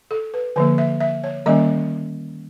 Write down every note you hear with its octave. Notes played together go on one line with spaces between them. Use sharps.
A4
B4
D3 F3 A#3 B4
E5
E5
C#5
D#3 G3 A#3 C#4 D#5